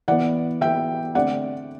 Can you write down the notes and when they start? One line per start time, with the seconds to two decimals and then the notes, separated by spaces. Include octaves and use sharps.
0.08 E3 B3 D5 F#5
0.61 E3 B3 E5 G5
1.15 D3 A3 C4 D5 F#5